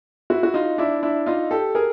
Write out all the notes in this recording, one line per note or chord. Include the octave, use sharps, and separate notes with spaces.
E4 F#4
F#4
D#4 F4
D4 E4
D4 E4
D#4 F4
G4 A4
G#4 A#4